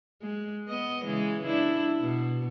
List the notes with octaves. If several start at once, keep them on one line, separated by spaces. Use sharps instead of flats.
G#3
B3 D#5
C#3 E3 G#3
D4 E4
B2